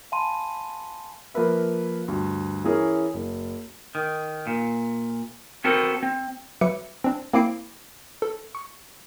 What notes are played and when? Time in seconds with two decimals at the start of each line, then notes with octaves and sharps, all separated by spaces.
0.12 F5 G#5 A5 B5 C6 D#7
1.34 F3 A#3 A#4 B4 E5
2.08 D2 G2
2.64 E3 C#4 E4 G#4 A#4 C#5
3.14 F#1
3.95 D#3
4.47 A#2
5.64 B3 C4 F#4 A4 A#4 C5
6.03 C4
6.61 F#3 B4 E5 D6 C#7
7.04 C4 D4
7.33 A#3 C4 E4 D6 C7 D7
8.22 A4
8.55 C#6